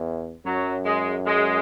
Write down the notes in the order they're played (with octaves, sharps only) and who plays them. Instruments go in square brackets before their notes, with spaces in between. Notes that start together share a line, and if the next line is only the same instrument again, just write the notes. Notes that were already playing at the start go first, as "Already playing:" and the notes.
Already playing: [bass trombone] E2
[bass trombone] F#2 [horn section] F#3
[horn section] G#3
G#3